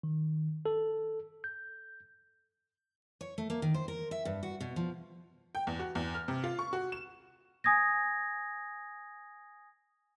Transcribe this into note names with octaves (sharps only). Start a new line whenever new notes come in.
D#3
A4
G6
C#5
A3
A#3
D#3
C5
A#4
E5
G2
F#4
B2
F3
G5
E2
F#4
E2
F6
C3
F4
C#6
F#4
E7
G#5 D#6 G#6 A#6